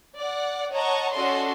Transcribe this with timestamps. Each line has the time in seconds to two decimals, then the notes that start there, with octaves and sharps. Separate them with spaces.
0.17 D5 F#5
0.72 C#5 D#5 F#5 A5 A#5 C#6
1.13 C#4 F#4 A4 D5 D#5 C6